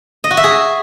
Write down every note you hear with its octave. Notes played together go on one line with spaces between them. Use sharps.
D#5
F#4
E5
G#4